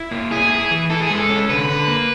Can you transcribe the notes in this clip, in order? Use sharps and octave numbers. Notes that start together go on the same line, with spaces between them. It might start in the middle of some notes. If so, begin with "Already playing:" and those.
Already playing: E4
A#3
E4 G#4
E4
E3
E4 A4
G#4
G#3 A4
C#4
D3 B4
D3
A#3